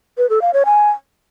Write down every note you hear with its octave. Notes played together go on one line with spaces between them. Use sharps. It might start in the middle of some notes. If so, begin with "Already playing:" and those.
B4
A4
F5
C#5
G#5